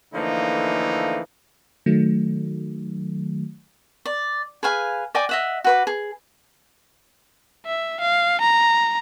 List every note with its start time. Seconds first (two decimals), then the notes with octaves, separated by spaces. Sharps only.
0.14 D3 E3 F3 A3 A#3 D#4
1.86 D#3 F#3 A3
4.06 D5
4.63 G#4 B4 F5 G#5
5.15 D5 D#5 G5 G#5
5.29 D#5 E5 F#5
5.64 F#4 B4 D6
5.87 G#4
7.66 E5
8.01 F5
8.41 A#5